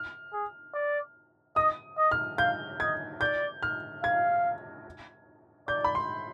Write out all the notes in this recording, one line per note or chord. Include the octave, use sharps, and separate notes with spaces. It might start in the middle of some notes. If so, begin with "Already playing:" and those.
Already playing: F6
G#4
D5
D#5 D#6
D#5
F6
F5 G6
D#5 G#6
D5 G6
F6
F5 G#6
D5 G6
B5
C6